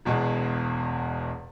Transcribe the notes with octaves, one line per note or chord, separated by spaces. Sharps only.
E1 E2 B2 G#3